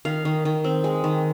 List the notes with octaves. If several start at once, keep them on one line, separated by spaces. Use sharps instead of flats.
D#3 F5
D#3
D#3
C4
G#3
D#3